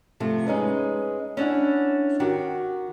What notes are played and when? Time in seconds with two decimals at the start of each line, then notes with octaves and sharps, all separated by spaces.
0.20 C3 F3 A3
0.47 G#3 C#4 D#4 B4
1.37 C#4 D4 E4 F#5
2.20 D#3 F#4 G4